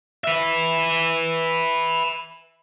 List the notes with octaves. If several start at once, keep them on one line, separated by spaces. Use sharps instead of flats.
B4 E5